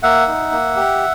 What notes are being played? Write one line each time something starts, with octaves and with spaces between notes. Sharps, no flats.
A#3 E5 F#5
D#4
A#3
G4